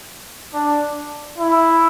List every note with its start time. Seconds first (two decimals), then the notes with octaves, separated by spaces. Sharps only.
0.54 D4
1.38 E4